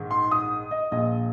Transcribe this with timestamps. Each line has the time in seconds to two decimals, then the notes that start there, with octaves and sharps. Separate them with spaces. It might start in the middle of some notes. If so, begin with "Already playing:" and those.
Already playing: A#1 G#2 D#3
0.11 C6
0.31 D#6
0.71 D#5
0.91 A#1 A#2 F3 D#5